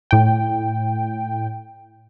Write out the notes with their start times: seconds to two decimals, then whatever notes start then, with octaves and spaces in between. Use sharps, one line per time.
0.11 A2 G5